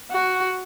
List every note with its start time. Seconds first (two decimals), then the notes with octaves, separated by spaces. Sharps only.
0.12 F#4